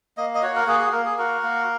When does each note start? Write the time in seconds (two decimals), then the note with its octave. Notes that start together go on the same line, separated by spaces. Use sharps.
0.17 A#3 D#5
0.35 D#5
0.42 F#4 C#5
0.55 A#4
0.67 A#3 G#4
0.80 G#4
0.92 A#3 A#4
1.05 G#4
1.18 F#4 A#4
1.43 A#3